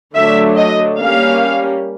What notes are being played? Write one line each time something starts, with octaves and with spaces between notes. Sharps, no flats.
D3 F#3 A3 D4 E5
D#5
G3 A#3 C#4 F5